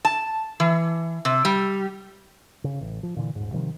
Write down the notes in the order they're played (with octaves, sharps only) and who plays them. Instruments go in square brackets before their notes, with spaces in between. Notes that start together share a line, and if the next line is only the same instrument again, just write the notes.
[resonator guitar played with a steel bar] A5
E3
C3
G3
[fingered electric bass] C#3
A1
F3
A#2 D3 E3
D#1 G#2
C3 D#3 F3 G3